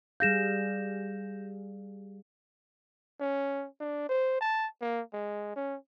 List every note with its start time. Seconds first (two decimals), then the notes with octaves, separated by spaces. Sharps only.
0.20 G3 G#4 F5 G6 A#6 E7
3.20 C#4
3.80 D4
4.09 C5
4.40 A5
4.81 A#3
5.13 G#3
5.56 C#4